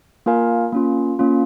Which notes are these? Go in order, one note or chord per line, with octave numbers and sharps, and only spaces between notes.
A#3 F4 A#4 F5 G#5
A#3 C#4 F4
A#3 C#4 F4